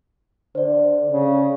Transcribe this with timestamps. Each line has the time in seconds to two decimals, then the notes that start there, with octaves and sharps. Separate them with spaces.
0.55 D3 C5 D5
1.11 C#3